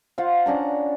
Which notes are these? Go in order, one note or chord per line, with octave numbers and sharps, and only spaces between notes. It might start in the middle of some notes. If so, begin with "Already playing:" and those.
F4 C5 F5 F#5
C#4 D4 F#5 A#5